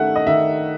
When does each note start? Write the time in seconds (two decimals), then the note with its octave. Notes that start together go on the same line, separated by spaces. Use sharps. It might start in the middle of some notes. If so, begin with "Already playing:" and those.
Already playing: D#3 A3 E5 F#5
0.16 D#5
0.27 D#3 E5